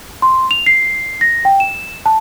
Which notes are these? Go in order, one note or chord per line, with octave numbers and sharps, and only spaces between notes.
C6
F7
C7
A#6
G5
E7
A5